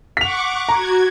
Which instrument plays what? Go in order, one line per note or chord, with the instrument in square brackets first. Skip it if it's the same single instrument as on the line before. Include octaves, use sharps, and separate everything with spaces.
[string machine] F#5 C#6 D6 [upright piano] B6 F7
[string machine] F#4 G#6 [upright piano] A#5